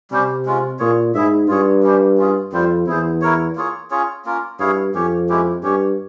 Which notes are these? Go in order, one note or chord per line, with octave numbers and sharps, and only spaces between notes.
C3 G3 C#4 G4 C5
G#3 C#4 F4
A#2 F4 G#4 C#5
G#2 E4 G#4 E5
G2 F4 G#4 C#5
G3 C#4 G4 C5
C#4 F4 G#4
F2 G3 C4 F4 C5
E2 E4 G#4 C5
E4 A#4 C#5
A#3 F4 G#4 C#5
C#4 F4 G#4 C#5
A#3 C#4 F4 A#4
G2 E4 G#4 C#5 F5
F2 C#4 G4 C#5
G#3 C#4 E4 G4
G2 C#4 G4 C#5